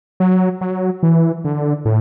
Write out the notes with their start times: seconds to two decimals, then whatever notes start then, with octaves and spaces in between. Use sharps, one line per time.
0.20 F#3
0.61 F#3
1.03 E3
1.44 D3
1.85 A2